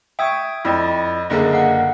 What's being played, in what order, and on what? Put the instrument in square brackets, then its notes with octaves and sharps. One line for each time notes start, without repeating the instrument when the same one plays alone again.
[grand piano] E5 C#6 [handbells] G5 D#6 G#6
[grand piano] F2 [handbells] E4 D5 D#5
[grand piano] F#1 D3 A#3 [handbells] G#4 D#5
[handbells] F5 F#5